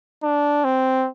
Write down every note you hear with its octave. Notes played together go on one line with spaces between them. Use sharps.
D4
C4